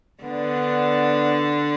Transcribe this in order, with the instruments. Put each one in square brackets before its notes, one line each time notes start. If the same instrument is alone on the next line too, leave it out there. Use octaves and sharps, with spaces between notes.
[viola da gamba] D3 D4 [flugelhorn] B3